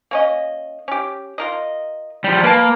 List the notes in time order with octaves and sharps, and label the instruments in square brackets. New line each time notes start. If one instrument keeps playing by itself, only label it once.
[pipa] A#3 C#4 D#5
C#4 G4
F4 A#4 D#5
[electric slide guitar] F3 G3
[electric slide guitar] A#3 [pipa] B4 A5